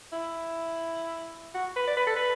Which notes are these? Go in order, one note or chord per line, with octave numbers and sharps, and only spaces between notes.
E4
F#4
B4
D5
B4
A4
B4